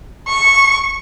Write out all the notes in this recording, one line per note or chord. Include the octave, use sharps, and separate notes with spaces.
C#6